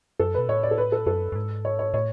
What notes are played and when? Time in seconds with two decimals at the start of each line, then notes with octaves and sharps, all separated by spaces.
0.19 F#2 A4
0.34 B2 B4
0.49 A2 C#5
0.63 D5
0.71 A4
0.78 B4
0.92 A4
1.06 F#2 A4
1.32 F#2
1.35 G#2
1.65 C#5
1.79 C#5
1.94 A2 C#5